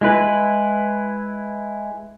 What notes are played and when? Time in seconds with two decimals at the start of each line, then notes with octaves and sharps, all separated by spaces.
0.01 G#3 E4 B4